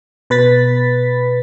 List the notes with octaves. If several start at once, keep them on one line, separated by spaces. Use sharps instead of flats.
B2 B4 B5 A6 B6